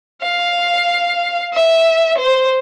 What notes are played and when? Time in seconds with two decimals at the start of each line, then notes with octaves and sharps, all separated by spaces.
0.22 F5
1.53 E5
2.18 C5